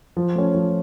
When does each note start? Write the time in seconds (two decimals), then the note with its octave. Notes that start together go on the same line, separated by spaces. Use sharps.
0.17 F3
0.35 A3 C#4
0.54 F3